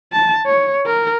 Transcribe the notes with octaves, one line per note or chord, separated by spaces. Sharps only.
A5
C#5
A#4